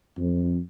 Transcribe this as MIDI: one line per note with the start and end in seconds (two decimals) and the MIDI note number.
0.17 0.57 41